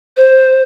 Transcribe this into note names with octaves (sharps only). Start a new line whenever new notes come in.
C5